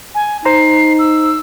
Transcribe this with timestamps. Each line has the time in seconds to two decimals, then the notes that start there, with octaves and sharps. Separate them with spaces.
0.15 G#5
0.45 D#4 C5 A#5 C7
0.99 E6